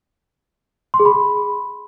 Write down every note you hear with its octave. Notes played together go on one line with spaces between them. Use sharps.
C6
G#4
B5